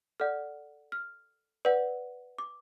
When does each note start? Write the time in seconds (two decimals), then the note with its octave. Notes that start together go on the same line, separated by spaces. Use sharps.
0.20 A4 D5 F#5 F6
0.92 F6
1.65 B4 D5 F#5
2.38 D6